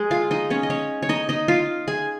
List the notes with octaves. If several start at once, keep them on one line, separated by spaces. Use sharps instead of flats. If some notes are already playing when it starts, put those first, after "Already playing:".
Already playing: G#3 G#4
F4 F5
D#4 D#5
C#4 C#5
D#5
C#4 C#5
C#5
D#4 D#5
D#4 D#5
F4 F5
G#4 G#5